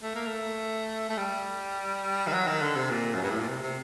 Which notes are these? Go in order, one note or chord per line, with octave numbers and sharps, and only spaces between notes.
A3
A#3
A3
A3
G3
D#3
F#3
D#3
D3
C3
A#2
F#2
G2
A2
A#2
C3
C3